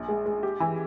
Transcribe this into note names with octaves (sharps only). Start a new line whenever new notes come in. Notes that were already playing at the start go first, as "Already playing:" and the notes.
Already playing: A#1
G#3
G#3
G4
E3